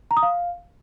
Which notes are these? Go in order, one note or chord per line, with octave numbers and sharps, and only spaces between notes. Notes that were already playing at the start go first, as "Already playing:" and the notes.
A#5
D#6
F5